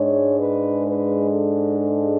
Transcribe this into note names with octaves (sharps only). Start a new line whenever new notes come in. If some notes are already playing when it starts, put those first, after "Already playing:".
Already playing: G#2 G#3 D4 C#5
B4
B4
A4
A4